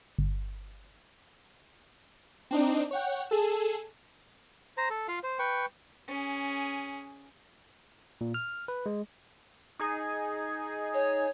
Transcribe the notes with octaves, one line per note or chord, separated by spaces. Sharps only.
G1
C4 D4 D#4
C#5 F#5 G5
G#4 A4 E7
C5 A#5
A4
F4 F5
C5
B4 G5 C#6
C#4 G#4
A#2
F6
B4
G#3
D#4 G#4 G#5
C#5